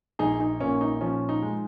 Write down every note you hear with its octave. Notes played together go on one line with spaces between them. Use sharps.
A#1 D#4 G#4
D#4
A#2 C#4
D#4
F3 C#4
D#4
G#3